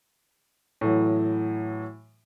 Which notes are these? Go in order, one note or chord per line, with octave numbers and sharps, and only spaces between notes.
A2 E3 F#3